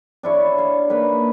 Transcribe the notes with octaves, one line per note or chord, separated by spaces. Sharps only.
D4 E4 C#5
F5
A#3 D#4 B4 E5